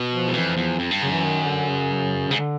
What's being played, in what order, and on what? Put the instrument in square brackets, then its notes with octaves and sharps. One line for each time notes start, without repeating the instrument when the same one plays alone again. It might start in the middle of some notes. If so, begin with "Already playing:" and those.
Already playing: [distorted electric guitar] B2
[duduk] F3
[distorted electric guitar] E2
[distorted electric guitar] F2 [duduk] E3
[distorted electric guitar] E2 [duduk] F3
[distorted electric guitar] F2
G2
[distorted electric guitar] F#2 [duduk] C#3
[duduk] E3
D#3
D3
C#3
[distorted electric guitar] G#2 [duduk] C#3
[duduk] D3